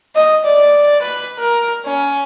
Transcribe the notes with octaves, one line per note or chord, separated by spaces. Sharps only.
D#5
D5
B4
A#4
C#4